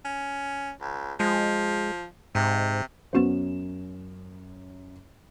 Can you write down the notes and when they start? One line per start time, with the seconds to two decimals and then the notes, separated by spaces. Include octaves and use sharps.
0.05 C#4
0.81 C#2
1.20 F3 G#3
2.35 G#2 C3
3.13 F#2 B3 C#4 F#4 C5 E7